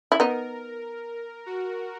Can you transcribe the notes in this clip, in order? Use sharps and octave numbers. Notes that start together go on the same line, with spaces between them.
E4
B3 D#4 A#4
F#4